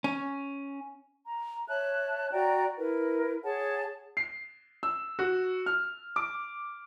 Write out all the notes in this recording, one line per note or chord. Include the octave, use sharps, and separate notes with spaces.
C#4
A#5
C#5 E5 A5 F#6
F#4 D5 G5 A#5
E4 A#4 B4
G#4 C#5 F#5 A5
C7
E6
F#4
F6
D6